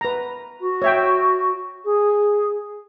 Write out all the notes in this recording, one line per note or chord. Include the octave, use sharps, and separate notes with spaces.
B4 A#5
F#4
C#5 E5 G5
G#4